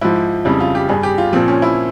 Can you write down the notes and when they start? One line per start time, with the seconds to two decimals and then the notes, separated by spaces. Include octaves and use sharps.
0.01 G#2 F3 E4
0.45 F2 C#3 G3 E4
0.60 F4
0.75 G4
0.89 G2 G3 G#4
1.03 G4
1.18 F4
1.33 A#2 F3 C4
1.48 C#4
1.62 E4